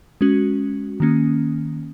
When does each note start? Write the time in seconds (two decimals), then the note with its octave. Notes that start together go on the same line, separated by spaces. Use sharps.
0.21 G#3 C#4 F#4
1.00 D#3 A#3 C#4